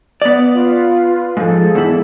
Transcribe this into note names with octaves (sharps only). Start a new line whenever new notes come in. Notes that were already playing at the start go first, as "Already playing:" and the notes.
B3 D5 D#6
F4 B4
G#2 F3 G#4 A4
E2 G#2 E4